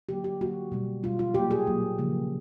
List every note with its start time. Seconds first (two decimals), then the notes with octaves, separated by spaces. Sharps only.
0.09 D3 F#3 A#3 G4
0.24 G4
0.41 D3 F#3 A#3 F#4
0.72 B2 G3 B3
1.03 B2 G3 B3 F4
1.19 F4
1.34 A#2 F#3 A#3 G4
1.51 G#4
1.67 A#2 F#3 A#3
1.98 C#3 F3 A#3